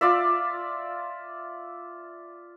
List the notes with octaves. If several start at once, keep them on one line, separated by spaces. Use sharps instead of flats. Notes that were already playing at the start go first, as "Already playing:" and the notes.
F4 D5 E5